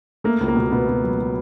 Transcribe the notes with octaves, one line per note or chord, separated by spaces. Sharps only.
A3 A#3
C#2
A#3
B2
B2 B3
B2
F#3
F#3